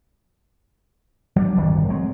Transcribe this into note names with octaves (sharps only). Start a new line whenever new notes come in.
F#3 G3 D4
D1 G1 C2 D#3
F#3 G#3 A3 C4